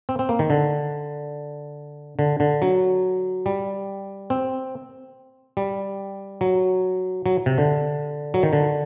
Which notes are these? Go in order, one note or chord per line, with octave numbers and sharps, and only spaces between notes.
C4
C4
A#3
D#3
D3
D3
D3
F#3
G3
C4
G3
F#3
F#3
C3
D3
F#3
D#3
D3